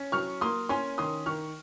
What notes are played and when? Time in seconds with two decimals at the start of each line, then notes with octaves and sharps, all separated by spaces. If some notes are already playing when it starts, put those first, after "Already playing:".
Already playing: C#4
0.12 F#3 C#6 F6
0.41 A#3 C6 D#6
0.69 C#4 G#5 C6
0.98 D#3 C6 D#6
1.26 D#3 C#6 F6